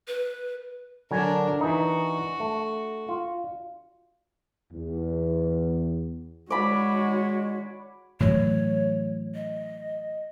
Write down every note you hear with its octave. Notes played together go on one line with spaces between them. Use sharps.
B4
D3 F#3 D4 A#4 G#5
E3 D#4 F#4
A3
F4
E2
G#3 F#4 C#5 D5 B5
A2 E3 F#3 C#5
D#5